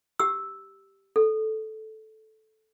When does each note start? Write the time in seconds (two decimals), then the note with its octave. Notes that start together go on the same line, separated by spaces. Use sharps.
0.19 G4 E6
1.16 A4